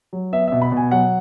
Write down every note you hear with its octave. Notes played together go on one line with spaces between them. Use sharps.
F#3
B3 E5
B2 E5
B5
B2
G#5
F#3 F#5